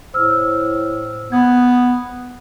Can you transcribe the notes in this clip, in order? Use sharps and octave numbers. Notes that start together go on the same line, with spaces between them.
A2 C5 E6 F6
B3 B5 D#6 G#6